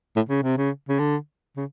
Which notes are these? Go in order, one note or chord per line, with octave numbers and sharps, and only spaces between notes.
A2
C#3
C3
C#3
C#3
D3
C#3